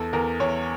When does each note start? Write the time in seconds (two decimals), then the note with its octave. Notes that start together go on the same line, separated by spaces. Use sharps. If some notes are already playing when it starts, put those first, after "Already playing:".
Already playing: E2 A4
0.13 E2 A#4
0.40 E2 C#5